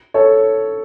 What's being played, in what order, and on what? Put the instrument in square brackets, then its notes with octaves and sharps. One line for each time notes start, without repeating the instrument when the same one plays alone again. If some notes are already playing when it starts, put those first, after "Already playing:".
[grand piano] A4 C#5